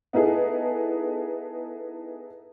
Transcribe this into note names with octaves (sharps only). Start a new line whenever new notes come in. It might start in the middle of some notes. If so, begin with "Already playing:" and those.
B3 D#4 E4 G#4 A4